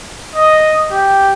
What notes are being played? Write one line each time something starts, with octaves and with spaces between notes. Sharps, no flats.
D#5
G4